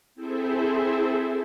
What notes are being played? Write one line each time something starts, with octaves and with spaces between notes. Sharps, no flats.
C4 E4 G#4 A4 C5 E5